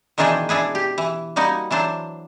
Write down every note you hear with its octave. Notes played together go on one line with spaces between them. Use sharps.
B2 D#3 E3 D4 G#4 G5
D4 E4 G#4 B4
G4
E3
G3 A#3 D#4 F#4
E3 F#3 D4 C5